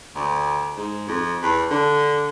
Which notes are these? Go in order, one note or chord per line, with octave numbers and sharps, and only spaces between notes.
D2
G#2
F2
E2
D3